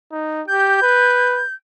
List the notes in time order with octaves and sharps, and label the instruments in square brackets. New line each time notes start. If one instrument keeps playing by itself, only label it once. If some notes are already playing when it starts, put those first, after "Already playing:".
[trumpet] D#4
[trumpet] G4 [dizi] G6
[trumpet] B4